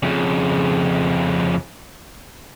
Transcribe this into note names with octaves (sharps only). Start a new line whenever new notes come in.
F2 C#3